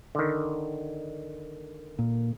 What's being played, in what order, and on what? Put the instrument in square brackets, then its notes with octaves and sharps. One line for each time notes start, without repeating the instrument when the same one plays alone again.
[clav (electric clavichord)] D3 D#3
[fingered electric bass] A#2